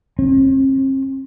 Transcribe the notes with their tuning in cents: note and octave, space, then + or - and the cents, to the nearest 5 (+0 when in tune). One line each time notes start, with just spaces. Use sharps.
C4 +40